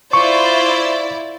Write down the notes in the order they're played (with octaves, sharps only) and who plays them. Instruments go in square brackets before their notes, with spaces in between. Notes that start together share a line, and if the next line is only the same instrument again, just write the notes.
[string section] E4 D5 [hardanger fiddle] F4 C5 [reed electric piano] C#6